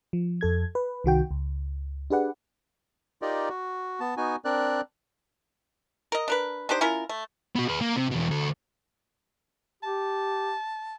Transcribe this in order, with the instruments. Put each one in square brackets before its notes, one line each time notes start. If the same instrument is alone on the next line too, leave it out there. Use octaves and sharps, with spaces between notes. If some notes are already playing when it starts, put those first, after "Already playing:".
[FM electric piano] F3
F2 A4 G#6
B4
C2 D#3 F#4 G5
C#2
D4 G4 G#4 B4 D5 F#5
[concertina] D#4 F4 G4 A#4 D5 D#5
F#4
B3 A5
B3 D#4 F#4 G#5
C4 D4 A#4 D5 F#6
[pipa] A#4 D#5
D4 A#4 B4
D4 D#4 G4 C5
C#4 E4 F4 A#4
A3
[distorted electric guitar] B3 F#4
G#4 B4
A#3
C3
E2 B2
D2 A4
[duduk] G4 [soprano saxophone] A5